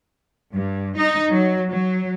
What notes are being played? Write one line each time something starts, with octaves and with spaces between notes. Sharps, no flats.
G2
D#4
F#3
F#3